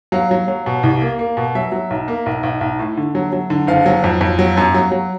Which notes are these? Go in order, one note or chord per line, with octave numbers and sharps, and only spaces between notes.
F#3 F5
F#3
F#3
B2
C2
A#3
A#3
B2
F#3 E5
F#3
B1
A#3
B1
B1
B1
A2
D3
F#3
F#3
D3
F#1 F5
F#3
F2
F2
F#3
F#2
F#3
F#3